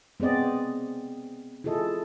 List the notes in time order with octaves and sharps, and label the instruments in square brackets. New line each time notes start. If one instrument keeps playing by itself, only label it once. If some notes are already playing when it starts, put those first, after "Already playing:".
[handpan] B3 C4 G#4 D5 D#5
E4 F4 G#4 A4 D#5